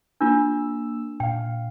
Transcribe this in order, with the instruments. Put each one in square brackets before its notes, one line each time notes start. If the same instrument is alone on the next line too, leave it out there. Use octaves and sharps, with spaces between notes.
[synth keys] A#3 E6 [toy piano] D4 F4
[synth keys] A#2 F5 [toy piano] G5